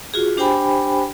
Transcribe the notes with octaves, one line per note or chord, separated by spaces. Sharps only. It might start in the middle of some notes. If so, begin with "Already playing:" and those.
F4 F#4 G#4
D4 G4 C5 G5 G#5 B5